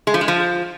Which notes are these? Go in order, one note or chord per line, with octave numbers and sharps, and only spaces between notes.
G#3
F3
G#3
F3